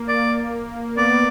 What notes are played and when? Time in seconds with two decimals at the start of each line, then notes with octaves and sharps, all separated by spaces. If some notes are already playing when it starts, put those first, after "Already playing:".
Already playing: A#3
0.08 D5
0.97 B3 D5